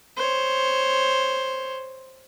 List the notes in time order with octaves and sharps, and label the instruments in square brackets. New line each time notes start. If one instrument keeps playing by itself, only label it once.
[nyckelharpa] C5 C#5